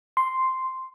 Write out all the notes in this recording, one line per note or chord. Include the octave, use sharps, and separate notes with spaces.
C6